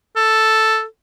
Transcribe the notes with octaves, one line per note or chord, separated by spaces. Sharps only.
A4